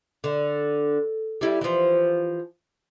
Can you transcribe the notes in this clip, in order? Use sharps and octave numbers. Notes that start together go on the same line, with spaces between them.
D3
G3 E4 G4
E3 F3